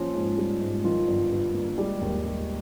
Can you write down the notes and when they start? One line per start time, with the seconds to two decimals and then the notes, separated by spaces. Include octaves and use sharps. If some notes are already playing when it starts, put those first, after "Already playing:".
Already playing: F3 A#3 C#4 F4
0.14 G#2
0.37 G3
0.61 G#2
0.84 D#3 F3 F4
1.07 G1
1.31 G2
1.54 A#3
1.78 G3 G#3 G4
2.01 D#2
2.24 D#3